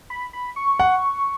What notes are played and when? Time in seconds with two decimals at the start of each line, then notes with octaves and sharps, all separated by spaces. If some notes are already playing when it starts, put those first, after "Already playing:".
0.10 B5
0.33 B5
0.56 C#6
0.80 F#5